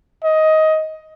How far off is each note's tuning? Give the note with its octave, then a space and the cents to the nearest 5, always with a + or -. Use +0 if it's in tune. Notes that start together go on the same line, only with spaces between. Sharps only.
D#5 +15